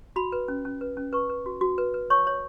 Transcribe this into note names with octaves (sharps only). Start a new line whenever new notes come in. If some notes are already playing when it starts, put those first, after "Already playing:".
F#4 B5
B4
C#4
C#4
B4
C#4
B4 C#6
B4
F#4
F#4
B4
B4
C#5 C#6
C#5